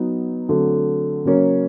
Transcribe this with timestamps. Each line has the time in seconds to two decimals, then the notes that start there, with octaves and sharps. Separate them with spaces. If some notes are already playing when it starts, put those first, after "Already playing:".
Already playing: F#3 B3 D#4
0.49 D3 F#3 A3 C4
1.25 C#3 F#3 A#3 C#4